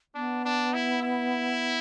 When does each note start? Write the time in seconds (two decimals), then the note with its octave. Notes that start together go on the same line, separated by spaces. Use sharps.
0.15 B3 D4
0.45 D4
0.73 E4
1.02 E4